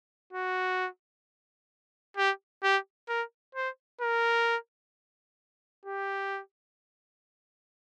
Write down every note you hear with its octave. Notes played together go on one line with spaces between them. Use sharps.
F#4
G4
G4
A#4
C5
A#4
G4